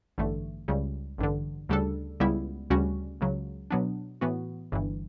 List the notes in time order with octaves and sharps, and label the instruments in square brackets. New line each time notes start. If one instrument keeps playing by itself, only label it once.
[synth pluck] A1 G2 D3 A3
C#2 C#3 G3
A1 G2 D3
D2 C#3 G3 D4 A4
C#2 C#3 G3 B3 E4
D2 C#3 G3 C#4 F#4
C#2 C#3 F#3
B2 F#3 B3 D4
A2 E3 B3 F#4
G1 G2 E3